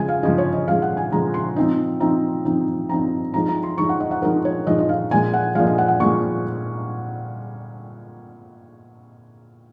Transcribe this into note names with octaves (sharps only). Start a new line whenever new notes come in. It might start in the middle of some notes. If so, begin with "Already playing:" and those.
Already playing: C#3 F3 G#3 G#5
F5
C#3 F3 G#3 D#5
C#5
D#5
C#3 F3 G#3 F5
F#5
G#5
C#3 F3 G#3 A#5
C6
F3 C4 D#4
F3 C4 D#4 A#5
F3 C4 D#4
F3 C4 D#4 A#5
F3 G#3 D#4 A#5
A#5
C6
F3 G#3 D#4 C#6
F#5
D#5
F#5
F3 G#3 D#4 A#4
C#5
F3 G#3 D#4 D#5
D#5
F5
A#2 F3 G#3 G#5
F#5
A#2 F3 G#3 F5
D#5
F#5
F#5
A#2 F3 G#3 C#6